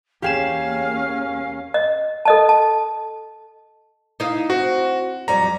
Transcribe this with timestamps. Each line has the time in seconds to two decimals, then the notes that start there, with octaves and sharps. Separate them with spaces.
0.22 E2 A#3 C#4 G4 G#4 F5 E7
1.74 D#5
2.25 A4 D#5 A5
2.49 A5
4.20 D#4 E4 F5
4.50 C4 F#4
5.28 F2 F#3 G3 A#5